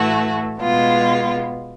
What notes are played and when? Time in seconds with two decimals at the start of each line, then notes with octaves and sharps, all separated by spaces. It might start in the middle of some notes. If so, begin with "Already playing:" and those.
Already playing: A2 E3 A3 F#4
0.59 B2 G#3 B3 F4